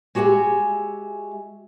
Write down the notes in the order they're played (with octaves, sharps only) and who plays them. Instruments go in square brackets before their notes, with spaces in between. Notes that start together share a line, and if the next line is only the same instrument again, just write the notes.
[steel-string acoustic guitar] G#3 F#4 G4 C#5 E5 G#5